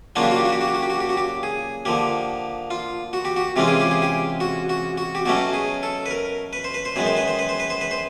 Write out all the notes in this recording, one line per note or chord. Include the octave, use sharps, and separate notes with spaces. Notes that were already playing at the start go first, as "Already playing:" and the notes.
C#3 F#3 A#3 D4 F4 F#4
G4
F#4
G4
F#4
G4
F#4
G4
F#4
G4
F#4
G4
F#4
G4
G#4
D3 F3 A#3 G4
F4
F#4
G4
F#4
C3 E3 G#3 C#4 F4 G4
G#4
G4
G#4
G4
F#4
F#4
F#4
G4
B2 F#3 A3 C#4 F#4
G#4
A4
B4
A#4
B4
C5
B4
C5
F#2 D#3 G#3 B3 B4
C5
B4
C5
B4
C5
B4
C5
B4
C5